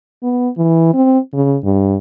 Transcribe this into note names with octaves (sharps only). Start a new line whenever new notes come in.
B3
E3
C4
C#3
G2